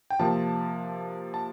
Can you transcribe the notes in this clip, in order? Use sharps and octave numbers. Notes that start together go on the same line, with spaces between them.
G5
C3 F3 A#3 A5
A5